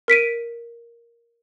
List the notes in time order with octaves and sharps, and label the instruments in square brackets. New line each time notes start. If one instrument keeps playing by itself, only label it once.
[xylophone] A#4 B6 D7 D#7